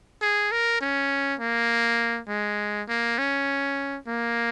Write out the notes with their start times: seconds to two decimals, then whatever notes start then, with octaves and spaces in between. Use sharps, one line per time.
0.22 G#4
0.52 A#4
0.81 C#4
1.40 A#3
2.29 G#3
2.89 A#3
3.19 C#4
4.08 A#3